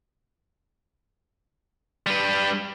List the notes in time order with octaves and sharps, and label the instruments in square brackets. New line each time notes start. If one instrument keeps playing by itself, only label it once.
[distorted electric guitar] G3 B4